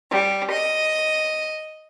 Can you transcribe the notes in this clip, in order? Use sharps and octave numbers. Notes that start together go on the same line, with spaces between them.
G3
D#5